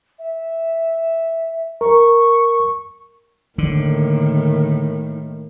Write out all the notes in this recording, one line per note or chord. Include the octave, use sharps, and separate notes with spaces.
E5
A#4 C#6
A2 D3 D#3 A#3